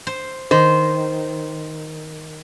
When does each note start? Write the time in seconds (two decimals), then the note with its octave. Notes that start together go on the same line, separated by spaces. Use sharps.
0.07 C5
0.51 D#3 C5